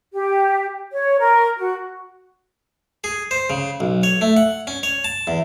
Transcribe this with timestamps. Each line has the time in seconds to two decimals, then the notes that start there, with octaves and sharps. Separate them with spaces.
0.13 G4
0.92 C#5
1.19 A#4
1.57 F#4
3.04 G#4
3.31 C5
3.50 C#3
3.80 B1
4.03 C#5
4.21 A3
4.37 F#5
4.67 C#4
4.83 C#5
5.04 A5
5.27 E2